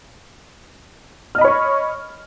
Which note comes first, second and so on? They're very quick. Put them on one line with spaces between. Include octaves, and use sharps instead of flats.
F6 D#5 B5 C#5 C#6